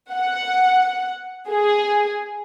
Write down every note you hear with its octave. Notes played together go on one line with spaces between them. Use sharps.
F#5
G#4